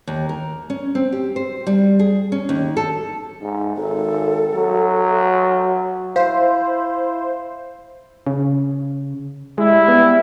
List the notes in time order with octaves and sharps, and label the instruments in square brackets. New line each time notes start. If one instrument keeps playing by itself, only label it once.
[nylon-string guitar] D#2
A#4
C#4
C4
G4
C5
G3
G#4
C#4
D#2
A4
[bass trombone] G#2
[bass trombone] G#1 [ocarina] A4
[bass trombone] F#3
[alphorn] E4 [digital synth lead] C5 [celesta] F5
[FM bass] C#3
[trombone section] G3 E4 [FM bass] G#3
[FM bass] B3